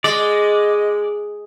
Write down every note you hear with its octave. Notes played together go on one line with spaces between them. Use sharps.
G#3 D5 D#5